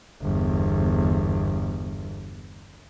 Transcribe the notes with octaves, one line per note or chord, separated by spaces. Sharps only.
G1 E2